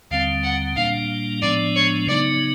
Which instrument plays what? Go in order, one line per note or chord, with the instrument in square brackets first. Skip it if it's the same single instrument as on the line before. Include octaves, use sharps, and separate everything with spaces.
[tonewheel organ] D#2 D3 G3 C4 [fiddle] F5
[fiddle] F#5
[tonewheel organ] A#2 G3 A#3 D4 [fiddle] F5
[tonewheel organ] A2 F3 G#3 B3 D4 [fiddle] D5
[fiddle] C#5
[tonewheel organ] C#3 F#3 B3 D#4 [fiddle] D5